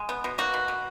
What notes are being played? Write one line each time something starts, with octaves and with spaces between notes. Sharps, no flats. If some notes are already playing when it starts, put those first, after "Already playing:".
Already playing: G#3
B3
B2
A#3 F#4
B2
B2